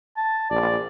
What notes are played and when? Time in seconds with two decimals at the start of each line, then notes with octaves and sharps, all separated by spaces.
0.17 A5
0.50 A#1 D5